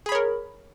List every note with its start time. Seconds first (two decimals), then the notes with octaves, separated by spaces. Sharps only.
0.06 G#4
0.09 B5
0.12 C#5
0.15 A#4